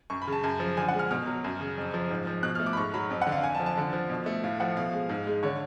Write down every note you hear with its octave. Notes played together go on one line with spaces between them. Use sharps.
F#2 C#6
B5
C#3
A5
F#2
F3
D3 G#5
F#5
G#3
F6
B2 F6
F#3
F#2
C#3
F2
F3
G#2
F3
B2 F#6
F6
A3
D6
B5
G#2 C#6
F#3 B5
F2
F#5
D3
F5
F2 G#5
A5
F3
A5
D3
F3
B2
A3
A2 F5
F3 F#5
B2 F5
G#3
G#2
G#3
D3 C#5